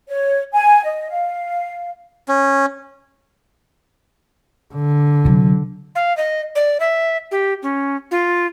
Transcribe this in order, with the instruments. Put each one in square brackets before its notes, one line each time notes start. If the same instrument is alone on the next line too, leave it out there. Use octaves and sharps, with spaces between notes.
[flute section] C#5
G#5
D#5
F5
[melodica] C#4
[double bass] D3
[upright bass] C3 F#3
[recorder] F5
D#5
D5
E5
G4
C#4
F4